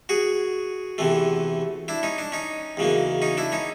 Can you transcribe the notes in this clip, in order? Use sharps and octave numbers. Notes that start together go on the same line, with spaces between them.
F#4 G#4
E2 C3 E3 A3
D4 E4
C#4 D#4
D4
C#4 D#4
E2 C#3 F#3 A#3
C#4 D#4
D4 E4
C#4 D#4